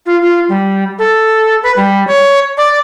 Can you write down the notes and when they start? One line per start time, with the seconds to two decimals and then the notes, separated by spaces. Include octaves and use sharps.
0.06 F4
0.22 F4
0.49 G3
0.99 A4
1.63 B4
1.76 G3
2.08 C#5
2.58 D5